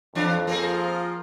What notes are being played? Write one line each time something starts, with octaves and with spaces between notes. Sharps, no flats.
F2 E3 D4
F3 A#3 C4 F4 G#4